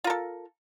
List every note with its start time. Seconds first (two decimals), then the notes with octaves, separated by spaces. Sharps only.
0.04 F4
0.07 A#4
0.10 A4